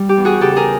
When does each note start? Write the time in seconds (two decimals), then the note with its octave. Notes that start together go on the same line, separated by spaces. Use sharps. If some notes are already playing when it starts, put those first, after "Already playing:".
Already playing: G3
0.09 G4
0.17 E2
0.25 F#4 G#4
0.41 C#3 G4 A4
0.56 G#4 A#4